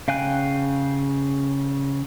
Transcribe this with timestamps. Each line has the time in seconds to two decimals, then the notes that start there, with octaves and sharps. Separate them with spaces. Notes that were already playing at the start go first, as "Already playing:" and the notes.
0.08 C#3 F5 G5 G#5 F#6